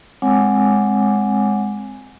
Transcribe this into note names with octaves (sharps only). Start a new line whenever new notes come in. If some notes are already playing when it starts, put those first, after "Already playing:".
G#3 C4 C#5 F#5 G#5 D6